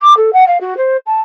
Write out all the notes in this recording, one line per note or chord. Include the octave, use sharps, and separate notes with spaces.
D6
A4
F#5
F5
F#4
C5
A5